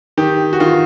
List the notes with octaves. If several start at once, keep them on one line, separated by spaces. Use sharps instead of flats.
D#3 G4
F#4
D#3 F4